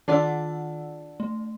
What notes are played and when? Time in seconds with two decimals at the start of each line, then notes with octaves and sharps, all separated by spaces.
0.08 D#3 D4 F4 D5 F#5 E6
1.20 A3